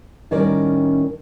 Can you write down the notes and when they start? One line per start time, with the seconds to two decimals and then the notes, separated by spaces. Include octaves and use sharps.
0.31 A2 D#3 G3 C#4 A#4 D5